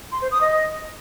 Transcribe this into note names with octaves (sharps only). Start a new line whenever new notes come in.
C6
C5
D#6
D#5